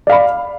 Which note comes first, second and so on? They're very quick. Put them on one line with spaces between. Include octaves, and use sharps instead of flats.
D5 F5 B5